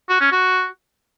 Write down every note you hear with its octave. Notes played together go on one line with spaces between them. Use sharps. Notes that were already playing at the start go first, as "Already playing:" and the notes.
F#4
C#4
F#4